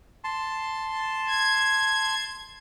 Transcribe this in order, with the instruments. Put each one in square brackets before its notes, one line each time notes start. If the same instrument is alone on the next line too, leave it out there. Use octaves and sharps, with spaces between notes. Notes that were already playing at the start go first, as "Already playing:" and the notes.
[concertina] A5 C6
[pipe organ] G#6